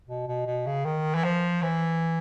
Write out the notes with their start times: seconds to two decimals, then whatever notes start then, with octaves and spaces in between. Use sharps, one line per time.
0.08 B2
0.28 B2
0.46 B2
0.66 C#3
0.85 D#3
1.15 E3
1.24 F3
1.62 E3